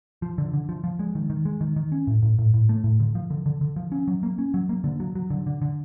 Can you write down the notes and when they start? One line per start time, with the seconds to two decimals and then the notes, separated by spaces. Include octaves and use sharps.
0.22 F3
0.38 D3
0.53 D3
0.69 F3
0.84 F3
0.99 G#3
1.15 D#3
1.30 D#3
1.45 G#3
1.61 D#3
1.76 D#3
1.92 C#4
2.07 A2
2.23 A2
2.39 A2
2.54 A2
2.69 A3
2.84 A2
3.00 D3
3.15 F3
3.30 D3
3.46 D3
3.61 D3
3.76 F3
3.92 C#4
4.08 F#3
4.23 A#3
4.38 C#4
4.54 F#3
4.69 A#3
4.84 D3
5.00 F#3
5.15 F#3
5.30 D3
5.47 D3
5.62 D3